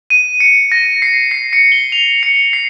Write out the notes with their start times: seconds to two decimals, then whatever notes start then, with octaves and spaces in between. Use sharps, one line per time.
0.10 D#7
0.40 C#7
0.72 A#6
1.02 C7
1.31 C7
1.53 C#7
1.72 G7
1.92 F7
2.23 C#7
2.53 C7